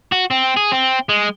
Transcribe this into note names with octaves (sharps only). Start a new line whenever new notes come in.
F#4
C4
G#4
C4
G#3